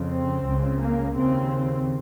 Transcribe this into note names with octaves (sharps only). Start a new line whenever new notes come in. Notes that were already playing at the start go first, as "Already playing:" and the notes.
Already playing: F2 C#3
C4
C#2 C#3
A#3
D#2 C#3 C4